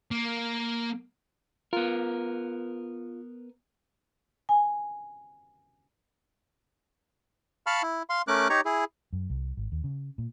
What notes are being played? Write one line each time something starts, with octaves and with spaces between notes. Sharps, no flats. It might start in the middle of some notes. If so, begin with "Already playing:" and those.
A#3
B3 F4 A#4
G#5
F5 A5 B5 C#6 F6
E4
F5 C6
A3 C#4 A#4 D6 F#6
D#4 G4 C#5 A#5 C#6
E4 G#4
F#2
C2
G#1
D#2
C#3
A#2